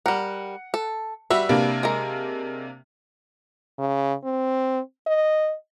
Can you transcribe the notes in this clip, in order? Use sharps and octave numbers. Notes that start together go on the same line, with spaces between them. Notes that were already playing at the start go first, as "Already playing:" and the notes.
G3 A#4 F#5
A4
G3 F#4 B4 E5
C3 A#3 D4
G#3 A#4
C#3
C4
D#5